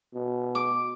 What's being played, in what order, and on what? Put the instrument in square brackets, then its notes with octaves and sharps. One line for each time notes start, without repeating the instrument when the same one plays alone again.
[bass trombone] B2
[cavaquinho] D6